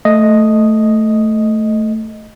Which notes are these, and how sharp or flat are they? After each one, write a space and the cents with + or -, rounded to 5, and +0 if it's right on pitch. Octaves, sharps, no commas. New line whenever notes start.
A3 +0 D#5 +0